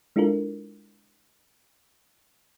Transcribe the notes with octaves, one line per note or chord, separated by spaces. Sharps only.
G#3 D4 E4 F4 A4 A#4